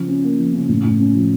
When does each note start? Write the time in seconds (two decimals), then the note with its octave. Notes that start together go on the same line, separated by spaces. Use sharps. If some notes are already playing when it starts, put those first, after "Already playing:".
Already playing: C#3 F3
0.08 C#4
0.24 A#3
0.39 F3
0.54 C#3
0.69 A2
0.84 A2
1.00 C#4
1.15 F3